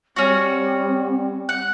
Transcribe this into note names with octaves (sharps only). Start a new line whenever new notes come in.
G3 C4 C#4 F#4
F#5